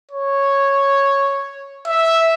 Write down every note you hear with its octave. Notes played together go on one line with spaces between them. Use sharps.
C#5
E5